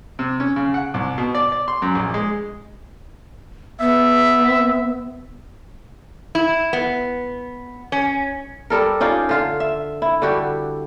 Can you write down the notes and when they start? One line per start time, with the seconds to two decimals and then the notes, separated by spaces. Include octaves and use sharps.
0.19 C3
0.40 C#4
0.56 C#3
0.74 F#5
0.94 C2
1.18 B2
1.35 D5
1.52 D5
1.68 C6
1.82 F#2
1.95 A#1
2.14 G#3
3.80 B3 E5
6.35 E4
6.73 B3
7.92 C#4
8.70 G3 A4 A#4
9.00 C#4 D#4 F4 D5
9.29 D3 F4 F5
9.60 E5
10.02 E4
10.22 D3 G3 F#4 G4